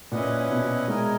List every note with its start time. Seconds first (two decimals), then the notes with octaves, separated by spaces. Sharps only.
0.12 A#2 C#4 E4 B4 D#5 F#5
0.51 B2
0.88 G#3 E4 A#4 D#5 G#5